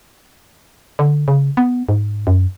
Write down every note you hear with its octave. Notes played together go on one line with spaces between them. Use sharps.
D3
C#3
B3
G#2
F#2